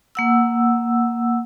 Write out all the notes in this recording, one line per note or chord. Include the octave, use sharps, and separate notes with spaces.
A#3 F#5 E6